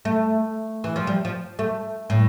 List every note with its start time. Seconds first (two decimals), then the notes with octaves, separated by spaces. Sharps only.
0.05 A3
0.84 E3
0.96 F3
1.07 G3
1.25 F3
1.59 A3
2.10 A2